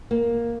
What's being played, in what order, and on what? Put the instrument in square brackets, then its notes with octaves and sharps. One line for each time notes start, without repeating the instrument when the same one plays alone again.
[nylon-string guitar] A#3